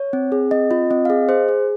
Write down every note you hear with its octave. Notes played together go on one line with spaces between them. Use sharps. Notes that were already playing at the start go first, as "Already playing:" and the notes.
Already playing: C#5
C4
G#4
C4 D#5
F4 D#5
C4 D#5
F5
G#4 D#5
G#4 C5
G#4